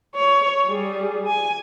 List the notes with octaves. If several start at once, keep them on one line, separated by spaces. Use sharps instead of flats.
C#5
G3 G#4
G#5